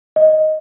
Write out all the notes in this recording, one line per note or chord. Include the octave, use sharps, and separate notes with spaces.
D#5